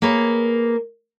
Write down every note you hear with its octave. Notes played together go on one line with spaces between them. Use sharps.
A#3 G#4 B4 C#5